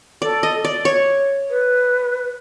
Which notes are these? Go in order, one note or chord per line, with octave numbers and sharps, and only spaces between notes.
A4 D5
D#5
D5
C#5
B4